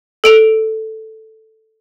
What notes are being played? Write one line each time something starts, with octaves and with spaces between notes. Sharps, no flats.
A4 D7 F7